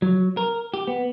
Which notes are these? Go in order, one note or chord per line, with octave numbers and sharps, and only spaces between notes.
F#3
A#4
G4
B3